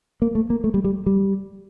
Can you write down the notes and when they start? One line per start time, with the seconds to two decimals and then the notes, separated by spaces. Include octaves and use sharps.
0.22 A#3
0.35 A3
0.50 A#3
0.64 A3
0.74 G3
0.84 G3
1.06 G3